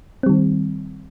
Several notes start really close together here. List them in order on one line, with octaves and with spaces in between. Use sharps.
C4 G3 D#3